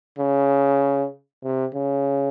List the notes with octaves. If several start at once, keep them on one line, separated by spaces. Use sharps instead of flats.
C#3
C3
C#3